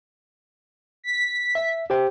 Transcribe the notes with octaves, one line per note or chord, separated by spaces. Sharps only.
B6
E5
G4 C5 G5